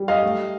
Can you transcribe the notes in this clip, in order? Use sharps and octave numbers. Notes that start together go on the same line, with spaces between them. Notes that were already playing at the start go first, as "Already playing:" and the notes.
Already playing: G3
D#5 F5
A3